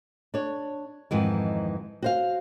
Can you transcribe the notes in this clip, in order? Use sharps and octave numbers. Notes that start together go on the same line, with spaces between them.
D4 C#5
F2 G#2 D#3 E3
F#4 C5 F5